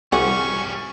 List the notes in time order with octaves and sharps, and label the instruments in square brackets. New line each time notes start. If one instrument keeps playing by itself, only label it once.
[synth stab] C2 [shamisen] E3 F#4 G#4 [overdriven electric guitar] G3 C#4 [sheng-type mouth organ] C#6